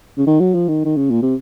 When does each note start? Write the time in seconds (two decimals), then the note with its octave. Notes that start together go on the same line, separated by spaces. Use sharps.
0.18 C#3
0.27 D#3
0.40 F#3
0.54 F3
0.68 D#3
0.85 D#3
0.96 C#3
1.10 A#2
1.22 C3